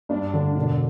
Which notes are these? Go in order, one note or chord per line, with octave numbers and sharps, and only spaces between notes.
G2 D4
D3
E1 D4